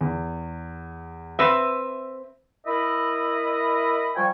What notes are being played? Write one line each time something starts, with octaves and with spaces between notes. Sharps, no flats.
E2
C4 B4 E5
E4 A#4 D#5 E5 B5
F3 G3 G5 G#5 C#6